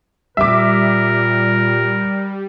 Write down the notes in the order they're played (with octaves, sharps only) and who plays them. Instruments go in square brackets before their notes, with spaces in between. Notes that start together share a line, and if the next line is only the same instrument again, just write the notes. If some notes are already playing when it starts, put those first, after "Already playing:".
[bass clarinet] A#2 [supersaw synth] G3 [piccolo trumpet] A#4 [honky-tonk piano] E5 D6